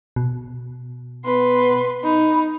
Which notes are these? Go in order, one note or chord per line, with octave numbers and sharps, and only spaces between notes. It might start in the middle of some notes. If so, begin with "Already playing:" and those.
B2
B3 B4 C6
D#4 B5